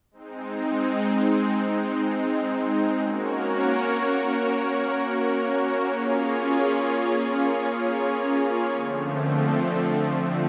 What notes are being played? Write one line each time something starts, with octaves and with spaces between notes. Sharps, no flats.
G#3 C4 D#4
A#3 C#4 F#4 A#4 C#5
A#3 C#4 F4 G#4 C#5
D3 F3 A3 C4